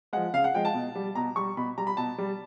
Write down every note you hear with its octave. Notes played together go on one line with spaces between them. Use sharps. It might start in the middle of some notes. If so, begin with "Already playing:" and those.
F3 G#3 F#5
C#3 F5
F#5
F3 G#3 G5
A5
B2
G3
B2 A#5
G3 C#6
B2 B5
G3 A#5
B5
B2 A5
G3